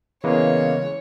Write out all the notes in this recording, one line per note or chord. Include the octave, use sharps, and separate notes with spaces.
C#3 E3 G#3 A#3 B3 C#5